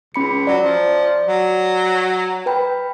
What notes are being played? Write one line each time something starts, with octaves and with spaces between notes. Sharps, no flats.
C#2 C#4 B5 C#7
F#3 D5
F3
F#3
B4 G5 B5